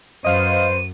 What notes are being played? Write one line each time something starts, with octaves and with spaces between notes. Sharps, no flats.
F#2 B4 C5 D#5 F5 F6 D#7